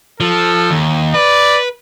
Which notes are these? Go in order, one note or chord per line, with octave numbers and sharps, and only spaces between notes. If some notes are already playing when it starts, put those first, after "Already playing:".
F3 A4
D#2
B4 D5